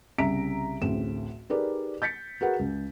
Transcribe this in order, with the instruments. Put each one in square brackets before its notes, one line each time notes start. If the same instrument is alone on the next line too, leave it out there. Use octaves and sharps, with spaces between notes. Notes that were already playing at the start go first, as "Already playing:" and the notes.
[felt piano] C2 C#3 E5 A#5 B6 D7
A1 D2 A2 C4 G#4 E7
D#4 G4 G#4 A#4 B4 D5
G6 A6 B6 C#7
F#4 G#4 A#4 B4 F#5
C#2